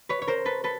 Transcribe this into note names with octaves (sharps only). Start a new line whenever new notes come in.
B4 C#5
C#5
A#4 C5
A4 B4
A4 B4